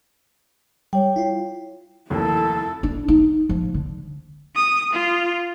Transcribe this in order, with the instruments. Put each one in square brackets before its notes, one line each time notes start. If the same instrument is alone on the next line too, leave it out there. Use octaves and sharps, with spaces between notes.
[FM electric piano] G3 [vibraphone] C#5 G5
[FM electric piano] E4 F4
[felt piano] F1 D#2 [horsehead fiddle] E4 A4
[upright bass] D4
D#4
F3
D3
[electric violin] D#6
F4